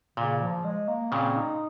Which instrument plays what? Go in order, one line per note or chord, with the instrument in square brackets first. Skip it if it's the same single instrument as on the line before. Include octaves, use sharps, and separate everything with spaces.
[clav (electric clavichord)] A#2 [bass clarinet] C#3
[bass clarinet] F3
G#3
A#3
[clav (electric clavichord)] A#2 C#3 [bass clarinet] C4
[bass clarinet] D#4